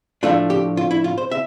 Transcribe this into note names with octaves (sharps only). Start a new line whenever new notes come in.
A2 F3 A3 D4 F4
G4
F4
E4
F4
C5
E5